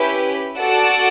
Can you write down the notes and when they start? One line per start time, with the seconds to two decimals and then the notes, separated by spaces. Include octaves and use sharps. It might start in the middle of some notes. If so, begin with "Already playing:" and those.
Already playing: C#4 E4 G4 B4
0.58 F#4 A4 D5 F#5 A5